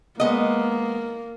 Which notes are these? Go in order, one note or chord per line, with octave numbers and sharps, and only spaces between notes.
G#3 A#3 B3 D#5